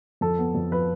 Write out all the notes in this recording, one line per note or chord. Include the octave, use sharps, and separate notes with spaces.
F2 A4
B3
F2
F3 B4